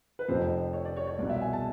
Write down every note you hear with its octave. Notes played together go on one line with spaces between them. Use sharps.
B4
F1 F2 C3 F3 C5
C#5
D5
C#5
C#5
C2 B2 D5
E5
G#5
A5